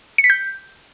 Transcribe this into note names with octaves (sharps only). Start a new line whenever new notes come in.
C#7
B6
G6